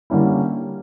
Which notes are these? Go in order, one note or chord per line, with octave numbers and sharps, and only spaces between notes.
D3 G3 A#3 C#4 E4